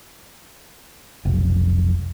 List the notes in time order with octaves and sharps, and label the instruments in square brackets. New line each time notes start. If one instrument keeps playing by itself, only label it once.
[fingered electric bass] F1 B1